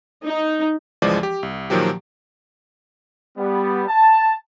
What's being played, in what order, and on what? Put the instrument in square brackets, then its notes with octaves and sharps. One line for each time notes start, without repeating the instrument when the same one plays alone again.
[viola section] D#4
[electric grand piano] G1 C#2 E3 F3 G#3 D5
G4
C2
A#2 D#3 F3 F#3 G4
[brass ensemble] G3 B3
A5